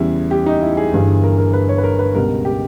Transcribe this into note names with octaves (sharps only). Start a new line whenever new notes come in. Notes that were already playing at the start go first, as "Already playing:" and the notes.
Already playing: E2 C#3 G3 E4
G4
D#4
E4
G#4
G1 G2 E3 G3
A#4
A#4
B4
C#5
B4
A#4
B4
C#2 B2 G3 A#4
G4